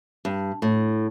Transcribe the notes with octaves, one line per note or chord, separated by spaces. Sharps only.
G2
A2